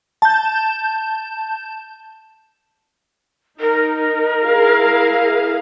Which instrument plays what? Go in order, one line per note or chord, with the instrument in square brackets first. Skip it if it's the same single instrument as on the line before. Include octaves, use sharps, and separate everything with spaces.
[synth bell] A5 G6
[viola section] D#4 [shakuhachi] A#4
[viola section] E4 G#4 F5